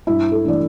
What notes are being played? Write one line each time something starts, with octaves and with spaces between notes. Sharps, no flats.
G2 E4
A4
E3 A3 D4 D5